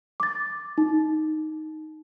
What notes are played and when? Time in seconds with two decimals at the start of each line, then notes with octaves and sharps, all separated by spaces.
0.20 D6 A6
0.78 D#4